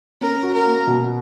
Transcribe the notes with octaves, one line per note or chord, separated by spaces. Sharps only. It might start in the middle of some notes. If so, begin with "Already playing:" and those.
C#4 A#4
F#4
A#4
A#3
B2